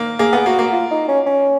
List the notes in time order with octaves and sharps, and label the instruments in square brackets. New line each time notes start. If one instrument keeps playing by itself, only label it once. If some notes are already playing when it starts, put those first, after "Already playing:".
Already playing: [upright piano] D#3 A#3
[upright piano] A#3 [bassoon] G#4
[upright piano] B3 [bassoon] G#4
[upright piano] A#3 [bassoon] F#4
[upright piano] A#3
[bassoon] F4
D#4
C#4
C#4